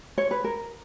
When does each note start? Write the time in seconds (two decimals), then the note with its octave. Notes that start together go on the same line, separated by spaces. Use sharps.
0.18 C#5
0.31 B4
0.44 A#4